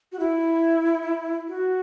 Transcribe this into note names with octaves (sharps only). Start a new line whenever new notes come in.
F#4
E4
F#4